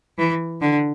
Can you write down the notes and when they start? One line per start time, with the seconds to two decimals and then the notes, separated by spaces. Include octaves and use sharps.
0.18 E3
0.61 D3